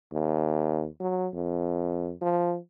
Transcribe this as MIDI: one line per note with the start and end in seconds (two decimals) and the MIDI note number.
0.12 0.87 39
1.00 1.28 54
1.33 2.12 41
2.21 2.57 53